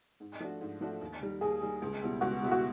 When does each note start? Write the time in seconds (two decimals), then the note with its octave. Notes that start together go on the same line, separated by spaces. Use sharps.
0.20 G#2
0.40 F3 A3 D4 F#4
0.61 G#2
0.81 F3 A3 D4 F#4
1.01 D#2
1.21 D#3 G3
1.41 D#2 G#4
1.62 D#3 G3
1.82 C#2
2.02 B2 G3 B3 E4
2.21 C#2 F#4
2.42 B2 G3 B3 E4
2.51 F#4